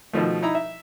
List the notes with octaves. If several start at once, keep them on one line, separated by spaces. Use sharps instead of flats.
B2 D#3 F3 A3
D#4 E4 A#5 B5
E5